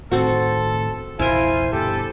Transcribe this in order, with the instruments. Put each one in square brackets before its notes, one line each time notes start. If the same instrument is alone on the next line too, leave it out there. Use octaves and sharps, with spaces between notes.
[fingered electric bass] A2 D#3 [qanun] C4 F#4 [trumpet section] A4
[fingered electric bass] A#1 E2 C3 [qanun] E4 A#4 [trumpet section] F4 G#5 [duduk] C5
[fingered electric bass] G2 B2 D3 [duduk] G4 [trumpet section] A4